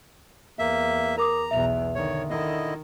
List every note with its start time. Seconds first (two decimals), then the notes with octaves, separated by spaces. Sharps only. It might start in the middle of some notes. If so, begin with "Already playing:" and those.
0.59 E2 A#3 E5
1.18 A#4 A#5 D6 D#6
1.51 B1 E2 E5 F7
1.95 D3 D#3 C#5
2.30 D3 D#3 E4 D#5